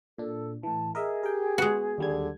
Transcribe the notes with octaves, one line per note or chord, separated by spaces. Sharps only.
A#2 D4 A4
A2 E3 A5
G#4 A#4 D#5 E5
G4 A#4 G5
G#3 B3 F#4
D#2 D3 G3 G#6